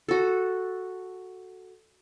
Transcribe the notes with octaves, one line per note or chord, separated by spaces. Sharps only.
F#4 A4